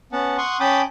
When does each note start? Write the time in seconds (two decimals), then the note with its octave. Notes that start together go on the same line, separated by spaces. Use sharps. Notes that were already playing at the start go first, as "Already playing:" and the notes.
0.12 B3 C#4 F#5 A5
0.38 F#5 C6 C#6 D#6
0.60 C#4 G5 A5 B5 D6 D#6